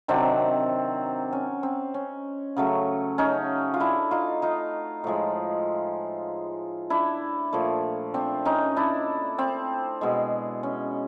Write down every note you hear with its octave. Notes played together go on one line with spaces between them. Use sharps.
C3 D#3 F#3 C4 D4
C#4
C4
C#4
C#3 F#3 A3
C#4 D#4
F4
D4 E4
D#4 F4
D#4 F4
A2 F3 G#3
D4 E4
A#2 F3 A3
C4 D4
C#4 D#4
D4 E4
C4
B2 G#3
C#4